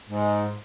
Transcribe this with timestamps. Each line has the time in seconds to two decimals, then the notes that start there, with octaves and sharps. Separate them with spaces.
0.10 G#2